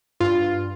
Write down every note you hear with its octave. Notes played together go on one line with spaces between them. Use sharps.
G2 F4